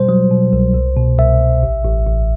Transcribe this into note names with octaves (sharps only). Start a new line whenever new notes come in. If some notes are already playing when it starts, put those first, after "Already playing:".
Already playing: B2 G3 C5
F#3
B2
C2
C2
B2
C2 E5
C2
A1
A1
A1